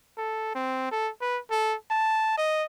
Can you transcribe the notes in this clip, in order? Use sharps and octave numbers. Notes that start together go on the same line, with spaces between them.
A4
C4
A4
B4
A4
A5
D#5